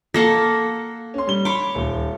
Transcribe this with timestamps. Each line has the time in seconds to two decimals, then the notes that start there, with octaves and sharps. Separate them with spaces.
0.14 A#3 A4 F#5 A#6
1.14 C#4 C6
1.27 G3 G7
1.45 C#5 B5 C6 D6
1.75 D#1